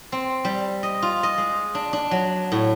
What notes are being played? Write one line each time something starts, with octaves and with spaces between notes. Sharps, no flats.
C4
G3
D#5
F4
D#5
G#3
D4
D4
F#3
A2